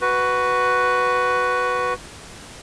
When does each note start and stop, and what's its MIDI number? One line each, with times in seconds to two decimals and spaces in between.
0.01 1.94 66
0.01 1.94 71